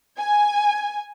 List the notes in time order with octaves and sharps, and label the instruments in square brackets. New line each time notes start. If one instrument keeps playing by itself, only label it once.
[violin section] G#5